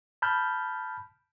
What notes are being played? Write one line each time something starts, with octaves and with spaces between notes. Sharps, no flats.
A5 B5 F6 G6